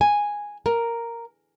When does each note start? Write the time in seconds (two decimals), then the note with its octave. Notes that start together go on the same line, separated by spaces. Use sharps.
0.01 G#5
0.66 A#4